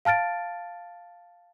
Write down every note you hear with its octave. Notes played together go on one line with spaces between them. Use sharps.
F5 A5 F6 A6 D7